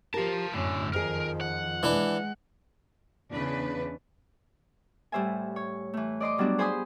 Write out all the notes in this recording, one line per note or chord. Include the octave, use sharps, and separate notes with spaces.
F3 G4 A#4 F5 A5
F#2 A2 D3 A3 C#4
F2 D#3 F3 G#4 A#4
F#5
E3 G#3 D4 B4
E2 C#3 D4 B4
A2 G3 C5 E5 G#5
C#5
E3 A3
D5 D#5 C6 D6
F#3 G3 B3 D4 F#4
G#4 C5 G#5 B5 C6 D#6